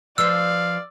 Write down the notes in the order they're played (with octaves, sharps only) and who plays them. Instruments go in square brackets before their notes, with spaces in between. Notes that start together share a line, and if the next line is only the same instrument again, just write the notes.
[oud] F3 B4 C5 [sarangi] D5 [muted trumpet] F5 [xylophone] E6 C7